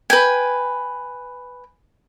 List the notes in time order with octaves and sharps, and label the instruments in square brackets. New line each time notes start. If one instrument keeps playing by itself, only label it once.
[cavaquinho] B4 G5 G#5